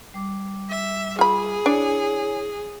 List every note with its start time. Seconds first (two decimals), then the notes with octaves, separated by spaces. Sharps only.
0.14 G3 D6
0.70 E5
1.19 F4 G#4 B5
1.66 D4 E4 C#5 G#5